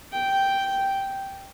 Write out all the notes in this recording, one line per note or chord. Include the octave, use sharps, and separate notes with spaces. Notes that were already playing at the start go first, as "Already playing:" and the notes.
G5